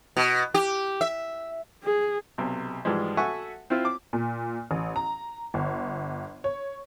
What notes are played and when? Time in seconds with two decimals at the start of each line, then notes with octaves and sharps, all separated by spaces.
0.16 B2
0.54 G4
1.01 E5
1.83 G#4
2.38 B1 C3
2.85 G#2 E3 F3 G3 G#3
3.17 F#4 A4 E5 F#5 G#5 C#6
3.70 C4 E4 F4
3.85 D6
4.13 A#2
4.71 A1
4.96 A#5
5.54 G1
6.44 C#5